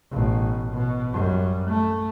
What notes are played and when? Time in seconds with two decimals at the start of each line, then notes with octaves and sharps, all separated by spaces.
0.12 A1 B2
0.72 B2
1.12 F#2 G3
1.69 A3